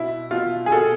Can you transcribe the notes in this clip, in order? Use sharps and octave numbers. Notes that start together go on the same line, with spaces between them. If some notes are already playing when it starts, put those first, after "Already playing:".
Already playing: B2 E4
B2 F4
G#4
B2 A4